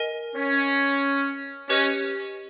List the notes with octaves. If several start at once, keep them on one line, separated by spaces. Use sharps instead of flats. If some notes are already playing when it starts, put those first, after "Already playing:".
Already playing: A#4 D#5 G#5
C#4
C#4 G4 B4 D#5